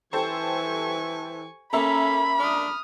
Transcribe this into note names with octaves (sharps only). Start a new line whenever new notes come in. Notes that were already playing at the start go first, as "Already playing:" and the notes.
E3 G4 A4 C5 G#5 C#6
A#3 C#4 A4 E5 A#5 B5
D4 D#6 F6